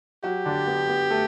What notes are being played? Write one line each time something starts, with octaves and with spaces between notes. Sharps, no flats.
F#3 F#4 G4
D3 D4
B3
B3
A3 A4